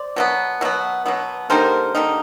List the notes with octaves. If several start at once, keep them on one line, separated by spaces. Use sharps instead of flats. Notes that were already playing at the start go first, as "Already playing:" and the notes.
Already playing: C5 D5
B2 F#3 B3
B2 F#3 B3
B2 F#3 B3
D3 G3 A#3 D#4 A#4 C5
D3 G3 A#3 D#4